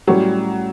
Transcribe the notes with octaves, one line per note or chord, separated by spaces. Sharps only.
A2 F#3 G3 C#4 G4 C#5